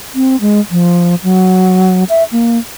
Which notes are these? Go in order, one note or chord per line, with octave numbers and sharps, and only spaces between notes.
C4
G#3
F3
F#3
E5
A#3